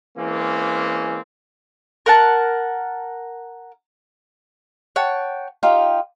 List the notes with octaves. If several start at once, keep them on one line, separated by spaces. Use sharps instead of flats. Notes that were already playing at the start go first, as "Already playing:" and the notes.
E3 G#3 A#3 C4 C#4
A#4 F#5 A5
C#5 F#5 G5 A5
D#4 F4 G4 G5